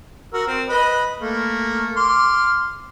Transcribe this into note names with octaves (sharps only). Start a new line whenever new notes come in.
F#4 A#4 E6
C4
B4 D#5 B5
A3 A#3
C6 D6 F6